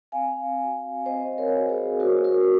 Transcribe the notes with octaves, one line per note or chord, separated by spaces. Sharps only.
C4 F5 G#5
F#4
C4 C5 D#5
A#4 C#5
F#4
G#4 C5
A#3 F#4 A#4
F#4 A#4